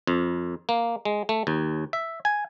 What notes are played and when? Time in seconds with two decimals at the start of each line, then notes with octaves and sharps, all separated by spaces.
0.07 F2
0.69 A#3
1.05 G#3
1.29 A3
1.47 D#2
1.93 E5
2.25 G#5